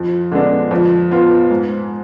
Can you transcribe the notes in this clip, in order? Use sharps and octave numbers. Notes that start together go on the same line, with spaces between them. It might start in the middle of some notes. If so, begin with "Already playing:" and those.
Already playing: F2
D3 G#3 B3 D4
F2
F3 B3 F4
G#2